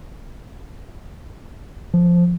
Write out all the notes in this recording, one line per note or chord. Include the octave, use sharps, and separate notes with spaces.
F3